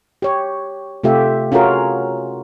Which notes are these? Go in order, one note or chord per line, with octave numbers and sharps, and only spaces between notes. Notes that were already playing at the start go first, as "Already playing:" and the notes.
G4 C#5
C3 A3 F4 G4 E5
C#4 F4 F#4 G#4 A#4